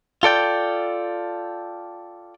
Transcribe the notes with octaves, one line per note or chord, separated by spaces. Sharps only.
F4 A4 D5 G5